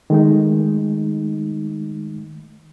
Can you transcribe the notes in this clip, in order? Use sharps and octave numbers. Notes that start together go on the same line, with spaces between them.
D#3 G#3 A3 D#4